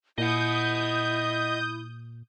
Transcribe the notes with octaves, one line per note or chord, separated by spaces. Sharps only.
A#2 E4 D#5 F#5 D#6 G6